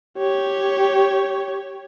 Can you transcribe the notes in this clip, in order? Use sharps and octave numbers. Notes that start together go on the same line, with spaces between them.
G4 C#5